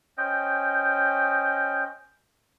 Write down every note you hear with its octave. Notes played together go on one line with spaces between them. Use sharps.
C#4 C5 D#5 G5